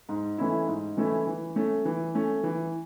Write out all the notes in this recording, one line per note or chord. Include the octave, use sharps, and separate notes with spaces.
G#2
E3 A3 C#4 E4
G#2
E3 A3 C#4 E4
E3
A3 C#4
E3
A3 C#4
E3